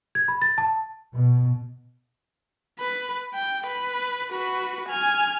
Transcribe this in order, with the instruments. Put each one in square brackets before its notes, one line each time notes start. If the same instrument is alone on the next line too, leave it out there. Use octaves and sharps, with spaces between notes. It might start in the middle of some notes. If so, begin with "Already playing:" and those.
[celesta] G#6
B5
A6
A5
[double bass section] B2
[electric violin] B4
G5
B4
F#4 B4
G#5 F6